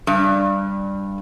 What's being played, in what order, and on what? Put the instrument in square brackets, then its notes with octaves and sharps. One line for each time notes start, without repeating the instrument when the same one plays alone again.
[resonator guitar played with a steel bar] G2